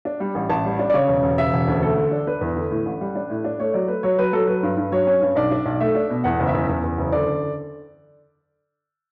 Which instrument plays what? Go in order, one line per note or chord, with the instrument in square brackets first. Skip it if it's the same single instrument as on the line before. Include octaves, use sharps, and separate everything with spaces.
[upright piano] D4
G3
A1
A1 A5
G3
D4
D5
C#3 C#5
E1
E1
C#3 E5
E1
D2
A3 A4
D3
D4
D4 B4
E2
D3
A2
A1
G3
D4
A2
D4
A3 C#5
F#3 D5
A3 B4
F#3 C#5
F#3 B4
F#3 A4
F#3 B4
G2
G2
F#3 C#5
C#4
G2
B1 D5
D4
B1
A3 E5
D4
B2
E2 F#5
F#1
E5
E2
E2
E2
F#1
D3 D5